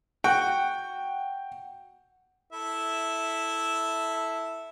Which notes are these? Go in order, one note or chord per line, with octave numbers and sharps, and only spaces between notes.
F#4 G5
E4 A4 E5